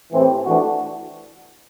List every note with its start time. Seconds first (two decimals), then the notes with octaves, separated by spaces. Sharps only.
0.12 A2 E3 A3 C4 G4
0.46 E3 A3 D4 F#4